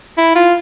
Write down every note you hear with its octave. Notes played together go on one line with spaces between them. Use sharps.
E4
F4